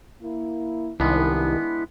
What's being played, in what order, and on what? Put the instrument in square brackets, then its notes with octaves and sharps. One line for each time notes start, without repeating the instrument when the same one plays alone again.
[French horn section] A#3 E4
[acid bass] C2 [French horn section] D#3 [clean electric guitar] G#3 B3 D4 [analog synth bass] E4